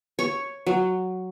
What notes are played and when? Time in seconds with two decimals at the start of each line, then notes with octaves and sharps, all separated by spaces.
0.19 C#5
0.66 F#3